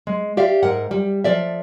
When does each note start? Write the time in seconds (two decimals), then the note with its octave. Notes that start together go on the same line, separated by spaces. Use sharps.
0.07 G#3
0.37 G4 D5 E5 F5
0.63 G#2 A#4 F#5
0.91 G3
1.24 F3 A4 D5 E5